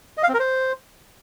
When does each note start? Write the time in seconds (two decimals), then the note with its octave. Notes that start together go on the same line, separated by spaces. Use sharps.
0.17 D#5
0.23 F5
0.28 C4
0.34 A#4
0.40 C5